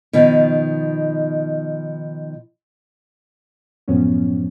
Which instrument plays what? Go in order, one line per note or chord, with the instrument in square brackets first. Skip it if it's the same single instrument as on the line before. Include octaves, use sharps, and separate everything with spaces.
[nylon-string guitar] B2 D#3 F3
[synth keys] F#2 A2 F3 B3 C#4